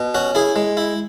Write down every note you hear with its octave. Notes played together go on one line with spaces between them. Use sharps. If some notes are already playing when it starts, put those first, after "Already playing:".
Already playing: B2
C#4 F#4
E4 G#4
G#3
E4